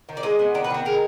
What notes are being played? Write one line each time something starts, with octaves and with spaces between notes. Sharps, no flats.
D#3
D5
G#3 D#5
B3
D#3 D5
B4
D#3 F#4
G#3 A#4